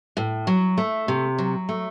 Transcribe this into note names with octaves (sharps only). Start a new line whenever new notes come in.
A2
F#3
A3
C3
F#3
A3